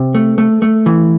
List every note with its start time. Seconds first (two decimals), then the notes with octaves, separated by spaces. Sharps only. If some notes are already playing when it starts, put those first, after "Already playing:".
Already playing: C3
0.15 A3
0.38 A3
0.62 A3
0.86 E3